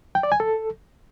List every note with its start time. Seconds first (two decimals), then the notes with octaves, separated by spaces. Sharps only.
0.15 G5
0.23 D5
0.32 G#5
0.40 A4